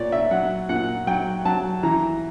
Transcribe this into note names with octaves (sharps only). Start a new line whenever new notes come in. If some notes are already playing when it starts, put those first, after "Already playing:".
Already playing: A#2 C#5 D5
E5
F#3 F#5
A#2 F#5
F#3 G5
F#3 A5
E3 A#5